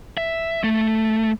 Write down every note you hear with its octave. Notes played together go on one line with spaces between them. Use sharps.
E5
A3